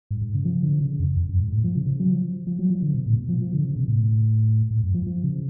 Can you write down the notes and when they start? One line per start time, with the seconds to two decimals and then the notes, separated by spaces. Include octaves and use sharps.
0.11 G#2
0.21 G#2
0.34 C#3
0.45 F3
0.63 D3
0.81 C#3
0.99 F2
1.16 F2
1.29 F#2
1.40 G#2
1.52 A2
1.64 F3
1.75 C#3
1.87 C#3
2.00 F#3
2.11 F3
2.47 F3
2.59 F#3
2.70 F3
2.82 D3
2.94 B2
3.06 A2
3.18 B2
3.29 F3
3.41 F3
3.53 D3
3.65 C#3
3.76 B2
3.88 A2
4.71 A2
4.83 F#2
4.94 F3
5.06 F3
5.24 C#3